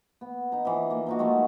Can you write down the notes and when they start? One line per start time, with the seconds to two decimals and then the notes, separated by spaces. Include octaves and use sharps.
0.21 B3
0.52 D#4 A#5
0.65 E3 F3
0.90 A#3
1.07 F3 D#4 F#4
1.19 D#3 G#3 A3 D#4